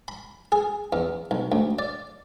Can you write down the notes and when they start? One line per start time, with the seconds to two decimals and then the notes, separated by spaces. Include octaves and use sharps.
0.08 B5
0.52 G#4
0.93 E2
1.31 B1
1.52 D2
1.79 D5